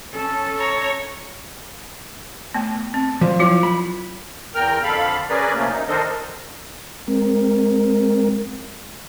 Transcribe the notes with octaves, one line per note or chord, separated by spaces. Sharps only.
C#4 A4
C#5 A#5
A3 B3
C4
F3 F#3
E4 F4 C#5
B5
E2 A#4 G5 F6
F2 D3 A4 F5 B5
C#4 G#4 A#4 B4 D5
C3 F#3 A3 A#3 C#4
D#4
D#3 D4 A4 A#4 C5 D#5
G#3 C4 A#4